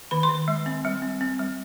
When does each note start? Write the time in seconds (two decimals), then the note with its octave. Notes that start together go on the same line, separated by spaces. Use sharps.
0.11 D#3 B5
0.23 C6
0.29 D#3
0.48 G#3
0.66 C4
0.85 G3
1.02 C4
1.21 C4
1.39 G3